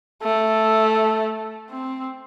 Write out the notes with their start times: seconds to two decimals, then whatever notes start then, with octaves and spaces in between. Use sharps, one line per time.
0.23 A3
1.69 C4